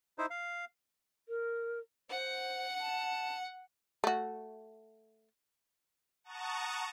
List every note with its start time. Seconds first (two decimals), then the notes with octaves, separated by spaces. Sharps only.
0.18 D#4 E4 C5
0.30 F5
1.29 A#4
2.10 C5 F#5
2.80 A5
4.04 A3 F#4
6.24 F#5 A5 A#5 C#6 D#6